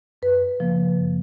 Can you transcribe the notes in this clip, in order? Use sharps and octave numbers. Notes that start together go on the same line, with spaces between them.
F#2 B4
C#3 F3 A#3
F#2